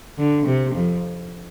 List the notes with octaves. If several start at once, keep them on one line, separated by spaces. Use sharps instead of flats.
D3
C3
F2